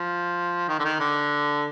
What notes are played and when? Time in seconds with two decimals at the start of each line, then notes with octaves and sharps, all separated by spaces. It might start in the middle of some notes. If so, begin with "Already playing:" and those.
Already playing: F3
0.68 D#3
0.79 D3
0.84 D#3
0.99 D3